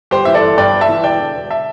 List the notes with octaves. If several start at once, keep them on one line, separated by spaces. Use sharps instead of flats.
G1 G4 C5
E3 E5
A4 D5
G1
G2 D5 G5
G1
E5 A5
E3
E1 D5 G5
D3
E1
E5 A5